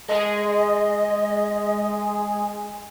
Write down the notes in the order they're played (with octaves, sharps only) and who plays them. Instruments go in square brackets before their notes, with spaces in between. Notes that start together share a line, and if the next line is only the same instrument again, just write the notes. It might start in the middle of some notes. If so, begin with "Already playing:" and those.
[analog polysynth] G#3 G#4 [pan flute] D#5